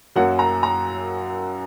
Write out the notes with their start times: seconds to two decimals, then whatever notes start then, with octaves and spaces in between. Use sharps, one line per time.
0.16 F#2 F#3 A#3 C#4 F#5
0.39 A#5
0.63 A#5